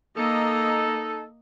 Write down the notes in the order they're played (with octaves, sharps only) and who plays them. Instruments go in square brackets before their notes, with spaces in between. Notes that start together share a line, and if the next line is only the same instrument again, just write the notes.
[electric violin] A#3 D#5 [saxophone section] D#4 A4